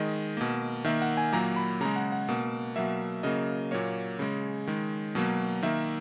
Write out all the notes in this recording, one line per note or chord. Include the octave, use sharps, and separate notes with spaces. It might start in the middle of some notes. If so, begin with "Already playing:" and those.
Already playing: D#3 G#3 D#5
B2 A#3
D#3 A#3 E5
F#5
G#5
A#2 F#3 A#3 A#5
B5
C#3 G#3 A#5
F#5
F#5
B2 A#3
B2 F#3 A#3 E5
C#3 F#3 A#3 D#5
A#2 F#3 A#3 C#5
C#3 G#3
D#3 G#3
B2 F#3 A#3
D#3 A#3 E5